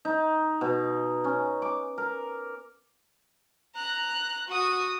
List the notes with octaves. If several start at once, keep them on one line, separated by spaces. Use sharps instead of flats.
D#4
B2
C#4
D6
A#4
A#5 F#6
F#4 D#6